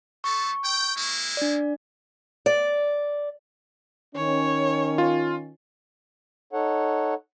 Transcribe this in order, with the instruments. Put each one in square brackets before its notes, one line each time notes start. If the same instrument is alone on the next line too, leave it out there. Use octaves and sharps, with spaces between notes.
[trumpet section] A3 A4 [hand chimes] C#6
[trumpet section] G5
G#3 A#3 E4
[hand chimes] D4 D5
[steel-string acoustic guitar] D5
[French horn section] D#3 C#4 [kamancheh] C#5
[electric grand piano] F4
[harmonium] D#4 A4 C#5 F#5